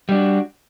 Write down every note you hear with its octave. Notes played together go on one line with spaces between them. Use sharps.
G3 D4 F#4